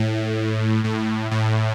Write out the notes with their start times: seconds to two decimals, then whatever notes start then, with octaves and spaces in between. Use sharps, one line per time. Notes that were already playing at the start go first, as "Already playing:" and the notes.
Already playing: A2
0.84 A2
1.31 A2